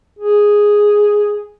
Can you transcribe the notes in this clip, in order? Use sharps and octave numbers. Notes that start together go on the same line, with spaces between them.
G#4